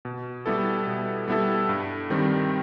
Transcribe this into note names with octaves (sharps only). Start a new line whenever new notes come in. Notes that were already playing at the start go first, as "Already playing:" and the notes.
B2
G3 B3 E4 A4
B2
G3 B3 E4 A4
G2
D#3 G3 C4